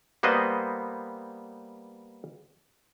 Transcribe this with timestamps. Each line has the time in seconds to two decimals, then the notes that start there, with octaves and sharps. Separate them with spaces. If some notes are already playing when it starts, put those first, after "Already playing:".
0.23 G3 A#3 B3 B4 C5 D#5